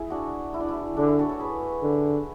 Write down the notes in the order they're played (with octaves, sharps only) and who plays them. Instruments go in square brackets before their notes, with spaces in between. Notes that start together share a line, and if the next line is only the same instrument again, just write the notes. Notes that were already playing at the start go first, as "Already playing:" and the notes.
Already playing: [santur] E4 G#4
D4 F#4
E4
D4
E4
[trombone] D3 [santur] D4
[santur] E4
F#4 A4
A4 C#5
G#4 B4
[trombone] D3